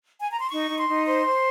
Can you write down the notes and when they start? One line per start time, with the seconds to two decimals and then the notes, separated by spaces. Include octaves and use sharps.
0.20 G#5
0.30 A#5
0.40 C6
0.50 D#4 C#6
0.68 D#4
0.78 C6
0.87 D#4
1.06 C5 C6
1.25 C5